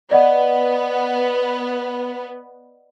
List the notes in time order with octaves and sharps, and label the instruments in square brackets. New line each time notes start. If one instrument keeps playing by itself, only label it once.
[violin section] B3 [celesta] D5 D#5 F#5